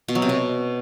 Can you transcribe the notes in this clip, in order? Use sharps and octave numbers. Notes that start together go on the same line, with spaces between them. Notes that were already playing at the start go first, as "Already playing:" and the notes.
B2
F#3
C3
B2